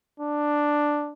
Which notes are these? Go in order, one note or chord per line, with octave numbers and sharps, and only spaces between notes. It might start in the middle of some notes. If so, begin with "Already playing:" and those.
D4